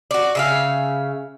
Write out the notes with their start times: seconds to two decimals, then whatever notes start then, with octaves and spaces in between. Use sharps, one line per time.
0.11 F#4 D5
0.35 C#3 E5 F5